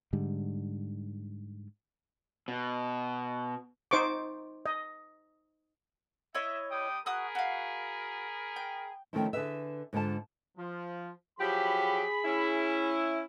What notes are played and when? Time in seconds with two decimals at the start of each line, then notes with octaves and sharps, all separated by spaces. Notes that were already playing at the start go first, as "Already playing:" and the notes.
0.13 G#2 D3 G3
2.48 B2
3.91 D#4 C5 C#6 D6
4.66 D#5
6.34 E4 C#5 D#5 E5
6.71 G3 G5 D#6
7.06 F#4 G#4 A#4 B5 D#6 F#6
7.35 F#4 F5
8.56 G5
9.13 D#3 F3 A3 C4 C#4 E4
9.33 D3 G#4 B4 E5
9.93 G#2 D3 F4 A5
10.57 F3
11.39 F3 F#3 G4 G#4 B5
12.24 C#4 E4